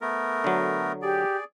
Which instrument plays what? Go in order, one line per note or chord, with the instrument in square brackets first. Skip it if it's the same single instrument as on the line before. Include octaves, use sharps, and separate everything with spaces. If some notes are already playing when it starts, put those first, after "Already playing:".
[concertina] A3 B3 A#4
[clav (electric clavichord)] D3 F#3
[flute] G4 [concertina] G#4 D5